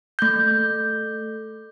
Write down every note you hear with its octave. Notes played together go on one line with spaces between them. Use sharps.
A3 G6